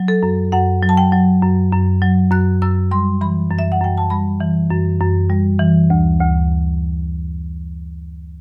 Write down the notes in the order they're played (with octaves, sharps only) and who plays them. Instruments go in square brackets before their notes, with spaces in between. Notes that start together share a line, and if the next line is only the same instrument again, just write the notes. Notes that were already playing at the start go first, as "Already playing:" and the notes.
Already playing: [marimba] F#3
A4
F#2
F#2 F#5
F#3
A5
G5
F#3
F#2
F#2
F#3
F#2 F#6
F#2 E6
G3 C6
E3 B5
F#2
E5
F#5
F#2 G5
A5
G3 B5
E3
F#2
F#2
G3
E3
D2
D2